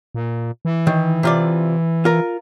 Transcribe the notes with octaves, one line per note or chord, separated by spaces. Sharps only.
A#2
E3
D#3
C3 F4 D5
F4 A#4